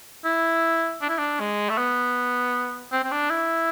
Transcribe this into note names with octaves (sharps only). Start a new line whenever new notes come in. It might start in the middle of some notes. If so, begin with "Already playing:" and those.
E4
D4
E4
D4
G#3
A3
B3
C4
C4
D4
E4